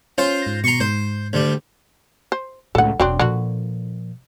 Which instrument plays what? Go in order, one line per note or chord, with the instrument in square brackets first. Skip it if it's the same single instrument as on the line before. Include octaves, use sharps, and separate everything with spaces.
[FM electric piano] C#4 [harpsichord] F4 C5
[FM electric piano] G#2 A#6
[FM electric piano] B2 [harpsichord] A#5 C6 C#6
[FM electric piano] G#2 [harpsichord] C5
[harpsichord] D2 G3
[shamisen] C5
[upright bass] C#2 A2 [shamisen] A4 F#5
[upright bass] E1 [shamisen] F#3 C4 D4
[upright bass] A#2 F3 [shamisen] D3 F#4